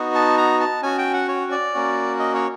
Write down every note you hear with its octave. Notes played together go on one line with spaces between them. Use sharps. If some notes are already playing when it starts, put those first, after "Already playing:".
Already playing: B3 D#4 F#4
A5
A#5
A5
C#4 F#4 G#5
G5
F#5
C#5
D5
A#3 C#4 F#4
D#5
C#5